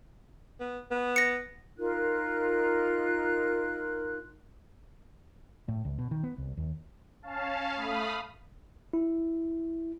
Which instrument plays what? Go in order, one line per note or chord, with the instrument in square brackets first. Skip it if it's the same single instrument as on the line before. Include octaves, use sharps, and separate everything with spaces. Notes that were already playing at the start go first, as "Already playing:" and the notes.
[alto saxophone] B3
B3
[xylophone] A#6 C#7
[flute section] D#4 F4 A#4 F#6
[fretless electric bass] A2
C#2
B2
D#3
B3
C2
D#2
[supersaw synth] C#4 F5 A5
A3 F5 B5 D#6
[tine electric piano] E4